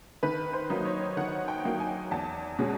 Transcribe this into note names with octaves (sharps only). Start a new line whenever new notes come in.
D#3 B4
C5
F#3 A#3 D#4
C#5
D#3 F#5
G5
F#3 A#3 D#4
G#5
E2 A5
B2 G#3 C#4